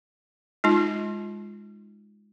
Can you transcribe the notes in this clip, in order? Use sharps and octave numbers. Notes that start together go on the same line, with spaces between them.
G#3 D#4 F4